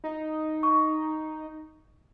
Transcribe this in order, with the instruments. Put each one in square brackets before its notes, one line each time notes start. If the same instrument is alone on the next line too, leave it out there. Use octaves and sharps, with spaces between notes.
[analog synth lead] D#4
[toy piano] C#6